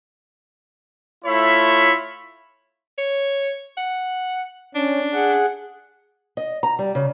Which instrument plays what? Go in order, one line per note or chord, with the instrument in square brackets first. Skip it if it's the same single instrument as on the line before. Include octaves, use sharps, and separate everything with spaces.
[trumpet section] A3 E4 F4 C#5 E5 B5
[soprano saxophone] C#5
F#5
[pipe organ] C#4 [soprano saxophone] D4
[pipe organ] G#4 F#5
[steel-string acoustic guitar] D#5
A#5
G3
C#3